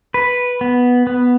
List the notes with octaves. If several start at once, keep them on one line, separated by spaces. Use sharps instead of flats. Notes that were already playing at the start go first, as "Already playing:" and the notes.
B4
B3
B3